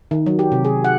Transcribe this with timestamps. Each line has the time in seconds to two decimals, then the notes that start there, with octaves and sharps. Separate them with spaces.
0.11 D#3
0.26 F#3
0.39 G4
0.52 C3
0.65 G#4
0.84 F#5